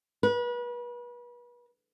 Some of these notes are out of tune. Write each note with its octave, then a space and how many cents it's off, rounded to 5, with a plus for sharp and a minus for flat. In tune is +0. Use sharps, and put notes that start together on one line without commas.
B4 -35